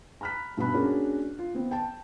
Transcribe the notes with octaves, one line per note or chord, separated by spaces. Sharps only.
A#5 B5 F6 F#6 B6
G2 B2 B4 B5 F#6
A#3 C#4 D4 F#4 G#4 A#4
F4
B3 C4
G5 A5